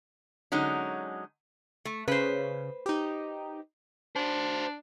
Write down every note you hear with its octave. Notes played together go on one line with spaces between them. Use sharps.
D3 F#3 G#3 C#4 D#4
A3
C#3 B4 C5
D#4 G4
D4 F#4 C5